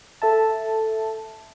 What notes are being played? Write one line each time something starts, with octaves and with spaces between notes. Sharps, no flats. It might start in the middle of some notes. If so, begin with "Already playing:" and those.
A4 E5 A5